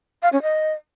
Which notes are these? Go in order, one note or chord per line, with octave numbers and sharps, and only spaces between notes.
F5
C#4
D#5